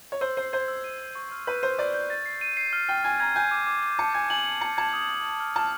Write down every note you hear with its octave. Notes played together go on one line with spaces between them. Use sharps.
C#5
C5 E6
C5 C7
C5 G#6
E6
D#7
D#7
C#6
F6
B4 G6
C5 G6
D5 G6
G6
A6
C7
D#7
C7
F6
G5 F6
G#5 G#6
A#5 G#6
G#5 G6
D6
D6
D6
A5 C#7
G#5 G#6
G#5 F#7
C#7
A5 C#7
A5 G#6
D#6
G#6
F6
F6
A5 F6